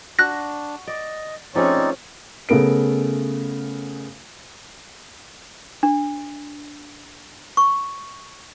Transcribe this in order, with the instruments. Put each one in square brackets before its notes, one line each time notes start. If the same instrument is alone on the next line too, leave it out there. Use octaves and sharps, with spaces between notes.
[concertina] D4 [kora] F#4 [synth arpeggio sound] F#6 A#6
[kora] D5 [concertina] D#5
[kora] F3 A3 G#4 [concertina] C4 D#4 D5 [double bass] C#4
[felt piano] C#3 A3 B3 A#4 D7
[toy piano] D4
C#6